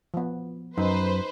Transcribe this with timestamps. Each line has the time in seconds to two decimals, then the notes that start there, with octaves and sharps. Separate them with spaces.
0.14 F3 B3
0.78 F#2 D#4 B4 C5